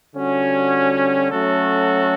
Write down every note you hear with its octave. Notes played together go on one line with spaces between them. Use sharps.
D3 G3 C#4 F#4
F#3 A3 C#4 F#4 A4